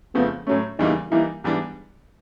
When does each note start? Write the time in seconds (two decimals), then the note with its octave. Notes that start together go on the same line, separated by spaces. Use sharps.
0.15 F2 C#3 F3 A3 B3
0.47 A2 F#3 A3 C#4
0.79 E2 C#3 E3 G3 A#3 D#4
1.11 E3 G3 A#3 D#4 E4
1.44 G#2 E3 G3 B3 D4